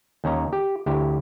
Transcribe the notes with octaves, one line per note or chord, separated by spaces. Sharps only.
D#2 C#4 A#5
G4
D2 E4 G4